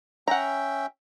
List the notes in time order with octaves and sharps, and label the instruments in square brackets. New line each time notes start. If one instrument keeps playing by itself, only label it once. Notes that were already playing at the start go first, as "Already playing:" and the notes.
[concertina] C#4 E5 G5 [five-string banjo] F#5 A#5